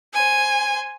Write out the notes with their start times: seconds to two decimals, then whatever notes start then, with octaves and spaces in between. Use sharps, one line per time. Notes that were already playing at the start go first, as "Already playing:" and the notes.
0.14 C5 G#5